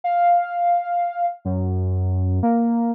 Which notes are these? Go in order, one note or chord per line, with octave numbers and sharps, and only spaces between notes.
F5
F#2
A#3